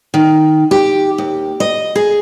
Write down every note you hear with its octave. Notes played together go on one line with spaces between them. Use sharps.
D#3
G4
D#2
D#5
G#4